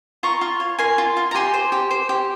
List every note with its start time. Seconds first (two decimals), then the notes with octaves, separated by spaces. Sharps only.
0.23 F4 A#5 C#6
0.41 F4
0.60 C#5
0.79 A#4 G#5 C6
0.98 F4
1.17 F4
1.31 A#5
1.35 G4 G#5 C6
1.54 C5
1.72 G4
1.91 C5
2.09 G4